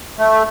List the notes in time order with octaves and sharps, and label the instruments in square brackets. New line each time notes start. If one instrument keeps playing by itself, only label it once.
[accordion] A3